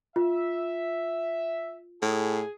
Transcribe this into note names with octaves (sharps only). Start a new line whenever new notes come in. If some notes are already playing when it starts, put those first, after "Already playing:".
F4 E5
A2 G#4